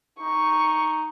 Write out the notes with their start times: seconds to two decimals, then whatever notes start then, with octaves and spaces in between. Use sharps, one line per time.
0.21 D#4 C#6